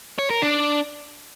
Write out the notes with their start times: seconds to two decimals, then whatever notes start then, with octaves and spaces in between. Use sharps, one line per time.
0.19 C#5
0.31 A#4
0.42 D4